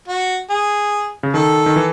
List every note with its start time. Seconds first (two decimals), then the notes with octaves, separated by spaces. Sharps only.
0.08 F#4
0.50 G#4
1.23 C#3
1.34 D#3 A4
1.66 D#3
1.76 E3